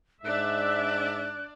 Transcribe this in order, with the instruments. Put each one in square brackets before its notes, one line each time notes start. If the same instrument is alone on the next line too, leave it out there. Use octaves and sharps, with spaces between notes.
[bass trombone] G#2 [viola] D4 D5 [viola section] E5 [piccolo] F#6